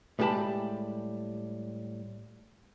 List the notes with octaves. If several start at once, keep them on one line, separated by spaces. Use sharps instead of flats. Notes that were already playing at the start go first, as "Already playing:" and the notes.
A2 G3 G#3 G4 A5 B5